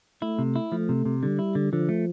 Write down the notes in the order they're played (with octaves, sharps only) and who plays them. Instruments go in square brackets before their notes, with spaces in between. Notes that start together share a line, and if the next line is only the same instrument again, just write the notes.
[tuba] A3 [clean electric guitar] E4
[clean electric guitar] C3
E4
[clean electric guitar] F3 [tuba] A3
[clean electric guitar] C3
C3
[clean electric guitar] D3 [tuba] G3
[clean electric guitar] E4
D3
[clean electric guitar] D3 [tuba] F3
[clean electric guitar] A3